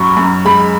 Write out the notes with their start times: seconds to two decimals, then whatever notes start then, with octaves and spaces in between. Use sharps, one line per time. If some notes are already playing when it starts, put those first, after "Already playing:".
Already playing: F#2 F#3 C#4 B5 C#6
0.17 F#2
0.45 G#3 B5